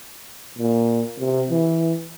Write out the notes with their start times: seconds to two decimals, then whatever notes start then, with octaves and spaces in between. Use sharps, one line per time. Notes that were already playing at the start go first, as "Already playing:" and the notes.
0.58 A#2
1.19 C3
1.50 E3